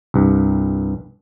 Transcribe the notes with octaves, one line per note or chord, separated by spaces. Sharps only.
C2 G2